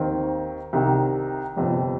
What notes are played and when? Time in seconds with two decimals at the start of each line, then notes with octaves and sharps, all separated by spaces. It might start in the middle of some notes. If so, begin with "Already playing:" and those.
Already playing: D#2 D#3 C4
0.73 C2 C3 D#3
1.56 G1 F2 C3